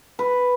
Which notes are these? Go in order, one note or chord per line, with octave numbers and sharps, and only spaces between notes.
B4